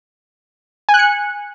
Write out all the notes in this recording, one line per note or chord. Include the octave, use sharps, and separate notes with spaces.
G#5
F#6
C#7